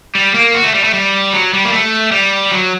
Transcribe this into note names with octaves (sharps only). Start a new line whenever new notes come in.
G3
A#3
F#4
A3
G3
A3
G3
F#3
G3
A#3
A3
G3
F#3